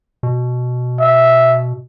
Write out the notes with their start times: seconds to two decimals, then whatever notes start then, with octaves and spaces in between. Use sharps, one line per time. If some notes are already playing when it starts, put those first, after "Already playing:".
0.23 B2
1.00 E5